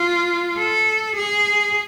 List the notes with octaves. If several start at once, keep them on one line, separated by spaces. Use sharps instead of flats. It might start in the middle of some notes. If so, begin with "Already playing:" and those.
Already playing: F4
A4
G#4